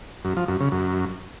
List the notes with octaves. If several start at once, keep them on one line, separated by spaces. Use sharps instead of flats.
F#2
F3
F#2
C#3
F#2